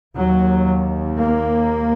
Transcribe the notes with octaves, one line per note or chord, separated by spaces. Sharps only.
D#2 F#3
A#3